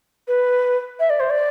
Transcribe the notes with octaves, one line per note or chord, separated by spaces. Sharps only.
B4
E5
D5
C5
D5